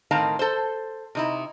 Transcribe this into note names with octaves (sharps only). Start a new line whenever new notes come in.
A2 D#3 C4 F5 A5 A#5
A4 C5
C3 D#4 E4